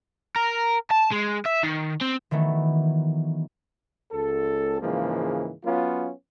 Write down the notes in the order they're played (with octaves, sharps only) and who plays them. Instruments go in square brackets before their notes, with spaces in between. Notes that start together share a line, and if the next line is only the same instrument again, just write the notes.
[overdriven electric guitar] A#4
A5
G#3
E5
D#3
C4
[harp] D#3 E3 F#3 A3 B3
[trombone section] C#2 A4
G#2 C#3 E3 F3 G#3 A#3
F#3 B3 C#4 F4